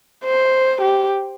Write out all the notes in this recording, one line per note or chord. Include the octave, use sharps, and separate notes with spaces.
C5
G4